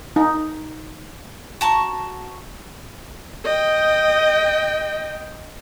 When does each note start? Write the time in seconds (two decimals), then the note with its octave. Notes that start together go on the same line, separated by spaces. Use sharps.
0.16 D#4
1.61 F#4 A5 A#5 C#6
3.45 D#5 G5